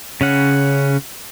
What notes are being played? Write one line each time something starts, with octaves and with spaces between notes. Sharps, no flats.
C#3 C#4 F#5